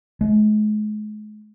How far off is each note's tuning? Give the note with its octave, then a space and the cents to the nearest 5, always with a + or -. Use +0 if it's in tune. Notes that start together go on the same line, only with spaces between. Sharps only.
G#3 +40